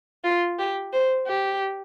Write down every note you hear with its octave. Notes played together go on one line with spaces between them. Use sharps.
F4
G4
C5
G4